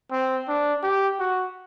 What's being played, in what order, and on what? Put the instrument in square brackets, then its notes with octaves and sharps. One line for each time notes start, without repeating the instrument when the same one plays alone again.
[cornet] C4
D4
G4
F#4